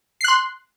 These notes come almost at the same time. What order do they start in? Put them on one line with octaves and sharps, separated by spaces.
C7 F#6 C6